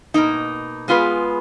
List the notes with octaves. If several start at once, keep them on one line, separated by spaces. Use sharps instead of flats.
B2 A#3 D#4
G#3 B3 F4 G#4 B4